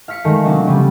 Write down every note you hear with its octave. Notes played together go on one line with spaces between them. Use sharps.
F5 F6 B6 C#7
D#3 G#3 A3
C3 F#3 D4 F4
C#3 F3 G3 D4